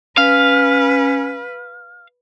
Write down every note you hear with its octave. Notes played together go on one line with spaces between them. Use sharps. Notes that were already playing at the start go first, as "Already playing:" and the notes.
C#4 B4 F5